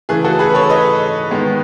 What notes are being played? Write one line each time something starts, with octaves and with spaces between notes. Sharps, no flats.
C#3 E3 A3 G#4
F#4 A4
G#4 B4
A4 C#5
B4 D#5
D#3 G#3 B3